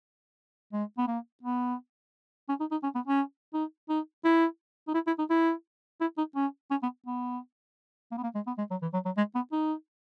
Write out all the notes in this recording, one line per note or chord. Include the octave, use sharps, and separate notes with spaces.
G#3
B3
A#3
B3
C#4
D#4
D#4
C#4
B3
C#4
D#4
D#4
E4
D#4
E4
E4
D#4
E4
E4
D#4
C#4
C#4
B3
B3
A#3
B3
A#3
G#3
B3
G#3
F#3
E3
F#3
F#3
G#3
B3
D#4